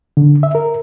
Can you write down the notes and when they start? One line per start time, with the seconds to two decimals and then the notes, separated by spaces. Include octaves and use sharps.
0.17 D3
0.43 E5
0.55 A#4